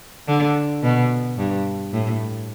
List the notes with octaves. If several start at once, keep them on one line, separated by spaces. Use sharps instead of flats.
D3
B2
G2
A2